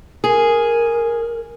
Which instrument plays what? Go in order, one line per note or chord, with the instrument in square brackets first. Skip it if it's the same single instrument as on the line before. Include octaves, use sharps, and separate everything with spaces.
[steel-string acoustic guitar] G#4 [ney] A#4